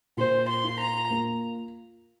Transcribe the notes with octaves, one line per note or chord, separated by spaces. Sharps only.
A#2 C5
C6
F4
A#5
A#3